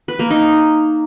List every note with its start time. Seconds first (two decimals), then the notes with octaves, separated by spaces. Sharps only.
0.08 B4
0.19 A#3
0.31 D#4